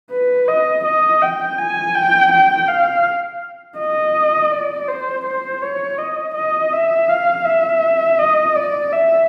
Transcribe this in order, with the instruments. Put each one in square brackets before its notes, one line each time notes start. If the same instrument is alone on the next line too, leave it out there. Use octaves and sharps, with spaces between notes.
[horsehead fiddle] B4
D#5
D#5
G5
G#5
G5
G5
F5
D#5
D5
C5
C5
C#5
D#5
D#5
E5
F5
E5
D#5
D5
E5